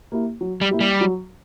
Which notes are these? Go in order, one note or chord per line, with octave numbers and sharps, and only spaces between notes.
A#3 E4 G4
F#3
G3
A#3 E4 G4
G3
F#3